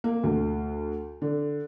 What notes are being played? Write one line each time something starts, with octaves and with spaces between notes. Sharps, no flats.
A#3
D2
D3